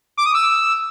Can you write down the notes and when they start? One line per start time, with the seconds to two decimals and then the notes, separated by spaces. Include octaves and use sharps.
0.17 D6
0.26 D#6
0.34 E6